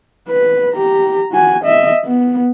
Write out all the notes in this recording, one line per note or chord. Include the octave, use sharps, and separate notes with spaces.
B4
G4 A#5
F#4 G#5
D#5 E5
B3